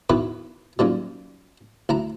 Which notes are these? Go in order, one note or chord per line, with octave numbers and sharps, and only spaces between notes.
E2 B2 D#3 E4 B4
F#2 A#2 D#3 G3
D2 E4 A#5